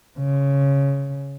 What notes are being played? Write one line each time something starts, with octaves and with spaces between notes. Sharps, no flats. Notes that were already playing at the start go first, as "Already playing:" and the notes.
C#3